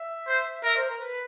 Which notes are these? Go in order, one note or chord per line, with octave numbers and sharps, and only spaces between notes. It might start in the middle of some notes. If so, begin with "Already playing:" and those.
Already playing: E5
C5
A#4 E5
C5
A#4
B4